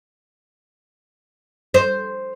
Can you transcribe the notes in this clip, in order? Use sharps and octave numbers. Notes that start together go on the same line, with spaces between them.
C5